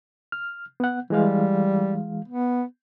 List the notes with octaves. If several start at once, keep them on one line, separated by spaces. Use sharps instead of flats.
F6
B3 F#5
E3 G3 G#3 F5
B3